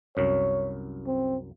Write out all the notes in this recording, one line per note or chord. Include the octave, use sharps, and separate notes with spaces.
C2 F#2 C#5
C4